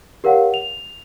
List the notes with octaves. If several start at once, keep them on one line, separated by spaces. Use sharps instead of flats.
G4 A#4 C#5 F5 F#5
F7